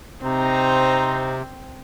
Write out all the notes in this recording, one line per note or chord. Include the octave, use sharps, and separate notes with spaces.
C3 C4 D#4 C5 A#5